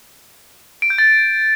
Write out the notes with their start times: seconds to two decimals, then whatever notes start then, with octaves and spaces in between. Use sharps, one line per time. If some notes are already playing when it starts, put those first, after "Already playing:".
0.82 D7
0.90 G6
0.98 A6